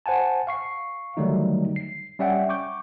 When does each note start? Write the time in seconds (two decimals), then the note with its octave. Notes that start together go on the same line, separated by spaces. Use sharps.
0.06 C5 F#5 G#5 A5
0.47 F5 C#6 C7
1.17 D3 D#3 F#3 G3 A3 D#4
1.76 C7
2.19 G3 C#4 D5 E5 F#5 G5
2.49 C#6 D6 G6